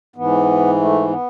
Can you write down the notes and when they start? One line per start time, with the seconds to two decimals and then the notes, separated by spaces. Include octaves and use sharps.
0.16 G#2 E3 B3
0.77 A3
1.08 B3